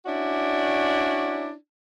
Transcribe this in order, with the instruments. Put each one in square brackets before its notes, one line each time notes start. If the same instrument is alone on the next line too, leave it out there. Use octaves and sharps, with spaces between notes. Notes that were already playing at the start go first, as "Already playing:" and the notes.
[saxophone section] C#4 D4 E4 F#4 D5